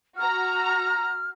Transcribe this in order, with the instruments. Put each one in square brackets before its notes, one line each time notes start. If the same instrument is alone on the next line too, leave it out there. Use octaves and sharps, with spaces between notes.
[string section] F#4 A#5 [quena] F6